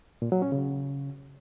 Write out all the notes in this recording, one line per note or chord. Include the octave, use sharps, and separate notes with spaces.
A#2
F#3
C#4
C#3